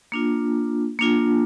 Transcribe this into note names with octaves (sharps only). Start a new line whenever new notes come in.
A#3 D4 F4
A#3 D4 F4